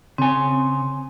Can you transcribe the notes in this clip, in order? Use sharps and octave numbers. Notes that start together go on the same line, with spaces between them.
C#3 C4 G#5